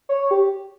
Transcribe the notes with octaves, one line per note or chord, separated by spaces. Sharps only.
C#5
C#5
G4